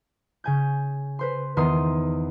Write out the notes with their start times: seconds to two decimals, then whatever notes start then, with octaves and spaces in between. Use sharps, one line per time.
0.44 C#3 G#5 G6
1.19 B4 C5 C6
1.57 E2 D#3 B3 C6 D#6 C7